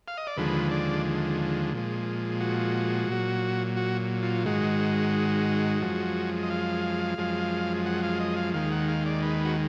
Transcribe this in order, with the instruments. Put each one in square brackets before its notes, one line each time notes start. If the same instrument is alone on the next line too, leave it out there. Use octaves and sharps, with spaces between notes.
[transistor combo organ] F5
D#5
D5
D#2 D3 F3 G#3 B4
D5
A#2 F3 G#3
F#4
A#2 F#3
F#4
F4
G#2 D#3 G#3 F#4
F#2 F3 G#3
D#5
F5
F#2 F3 G#3
F#5
F5
D#5
F5
D#2 D#3 G#3 F5
F#5
F5
D5
B4
F#4